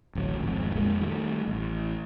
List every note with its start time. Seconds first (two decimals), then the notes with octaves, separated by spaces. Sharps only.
0.15 D1 A1 F3 F#3
0.41 D#1 G#1 F2 G#2
0.75 F2 A#2 G#3 A#3
1.01 D#3 G3 A3
1.48 A1